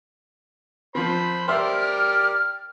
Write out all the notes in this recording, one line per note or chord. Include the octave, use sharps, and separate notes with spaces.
F3 C4 C5 B5
G4 A#4 C5 D5 E5 F6